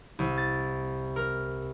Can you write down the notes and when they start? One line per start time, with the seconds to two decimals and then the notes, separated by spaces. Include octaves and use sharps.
0.19 C2
0.37 A6
1.16 A#4